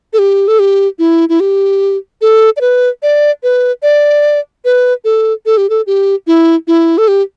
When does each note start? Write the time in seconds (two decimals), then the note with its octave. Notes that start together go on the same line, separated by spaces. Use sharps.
0.13 A4
0.19 G4
0.48 A4
0.59 G4
0.99 E4
1.29 E4
1.40 G4
2.22 A4
2.57 D5
2.61 B4
3.03 D5
3.43 B4
3.83 D5
4.65 B4
5.05 A4
5.46 A4
5.57 G4
5.70 A4
5.87 G4
6.27 E4
6.68 E4
6.98 A4
7.08 G4